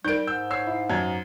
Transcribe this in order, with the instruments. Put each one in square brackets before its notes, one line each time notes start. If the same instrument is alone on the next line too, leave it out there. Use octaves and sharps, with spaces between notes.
[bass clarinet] G3 [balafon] D#4 A#4 [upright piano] G6 D7
[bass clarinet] G#2 [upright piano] E6 G6
[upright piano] C#5 E6 C7
E4
F#2 A#5 G#6